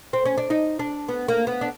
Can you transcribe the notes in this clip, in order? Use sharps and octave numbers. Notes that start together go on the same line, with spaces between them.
C4
C#4
D4
D#4
D4
B3
A#3
B3
D4